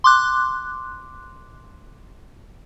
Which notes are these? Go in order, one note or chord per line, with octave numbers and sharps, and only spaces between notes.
C6 D6 F#6